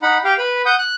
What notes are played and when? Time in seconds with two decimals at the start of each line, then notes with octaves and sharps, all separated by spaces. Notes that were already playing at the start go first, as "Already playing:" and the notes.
0.02 D#4 F#5 B5
0.24 G4 F5 G5
0.38 B4 B5
0.66 F#5 D#6 G6
0.78 F#6